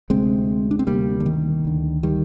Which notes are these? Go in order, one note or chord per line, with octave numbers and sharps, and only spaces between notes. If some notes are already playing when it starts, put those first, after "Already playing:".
D2 C3 G#3 C4
D4
C4
D2 C3 G3 A#3
D3
D#3
D2 D3
D#3 G3